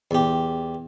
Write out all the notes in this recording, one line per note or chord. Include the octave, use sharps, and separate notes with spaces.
E2 G4